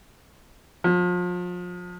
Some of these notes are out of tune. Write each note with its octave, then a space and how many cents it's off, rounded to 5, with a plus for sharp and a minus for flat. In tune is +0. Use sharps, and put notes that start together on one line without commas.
F3 +35